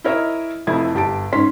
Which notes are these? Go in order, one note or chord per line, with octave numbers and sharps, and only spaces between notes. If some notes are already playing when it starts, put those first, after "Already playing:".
E4 A#4 C#5 D#5 E5
F1 F2 A3 E4 G#6
G1 G4 A5 D7
G#2 C#4 C6 B6